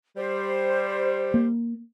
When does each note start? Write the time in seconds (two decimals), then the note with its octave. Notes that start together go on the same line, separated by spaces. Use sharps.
0.17 G3 C5
1.34 A#3